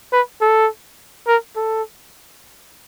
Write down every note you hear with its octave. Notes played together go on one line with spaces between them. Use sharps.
B4
A4
A#4
A4